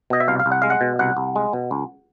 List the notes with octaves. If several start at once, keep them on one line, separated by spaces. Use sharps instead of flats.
B2 D#5
E5
C2 F5
F5
C2
F#5
G#3 F5
F#5
B2
C2 F#5
C2
G#3
B2
C#2